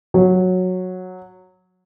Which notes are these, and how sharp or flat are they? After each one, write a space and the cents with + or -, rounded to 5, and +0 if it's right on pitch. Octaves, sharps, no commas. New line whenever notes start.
F#3 -10